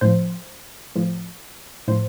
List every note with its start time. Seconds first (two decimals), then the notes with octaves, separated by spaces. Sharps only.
0.01 A2 F3 C5
0.95 A2 F3
1.88 A2 F3 C5